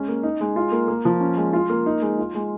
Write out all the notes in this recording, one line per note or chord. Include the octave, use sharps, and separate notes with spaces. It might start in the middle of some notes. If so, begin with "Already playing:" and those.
Already playing: G#3 C#4
A#3
D#4
G#3
F4
A#3
A#3
F3
C#4
G#3
F4
A#3
D#4
G#3
F4
G#3